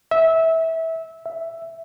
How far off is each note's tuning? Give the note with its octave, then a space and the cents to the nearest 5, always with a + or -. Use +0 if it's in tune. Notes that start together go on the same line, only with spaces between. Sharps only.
E5 -20
E5 +5